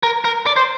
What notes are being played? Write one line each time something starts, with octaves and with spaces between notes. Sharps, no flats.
A#4
A#4
D5
C5